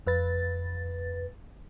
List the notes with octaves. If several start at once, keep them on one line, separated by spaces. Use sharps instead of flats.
F2 B4 A6